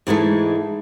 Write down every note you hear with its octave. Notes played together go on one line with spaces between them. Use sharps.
G#2 E3 G#3 A3